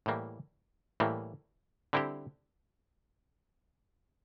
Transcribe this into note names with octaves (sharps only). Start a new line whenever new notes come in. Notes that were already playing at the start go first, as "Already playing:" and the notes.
A2 E3 G3 A#3
A2 E3 G3 A#3
D3 G3 C4 E4 G4